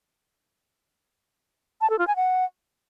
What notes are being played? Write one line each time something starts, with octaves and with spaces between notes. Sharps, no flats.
A5
A4
F4
G#5
F#5